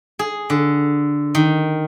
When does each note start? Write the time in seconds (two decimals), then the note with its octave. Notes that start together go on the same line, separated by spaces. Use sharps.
0.19 G#4
0.50 D3
1.35 D#3